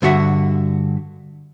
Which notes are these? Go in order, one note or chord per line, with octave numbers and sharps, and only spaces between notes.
G2 D3 F4 F#4 E5 F#5